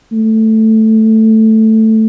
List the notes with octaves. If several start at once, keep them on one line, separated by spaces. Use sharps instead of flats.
A3